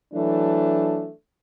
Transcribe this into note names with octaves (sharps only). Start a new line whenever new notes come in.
E3 F#3 A3 D4